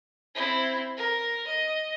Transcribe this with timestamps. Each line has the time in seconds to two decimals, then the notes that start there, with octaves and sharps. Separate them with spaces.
0.35 C4 E4
0.98 A#4
1.47 D#5